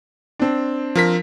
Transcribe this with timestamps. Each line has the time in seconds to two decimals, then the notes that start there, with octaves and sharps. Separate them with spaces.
0.39 C4 D4
0.95 F3 A#4 B6